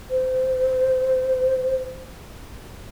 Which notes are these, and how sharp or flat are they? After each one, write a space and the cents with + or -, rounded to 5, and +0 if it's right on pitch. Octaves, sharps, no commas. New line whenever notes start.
C5 -20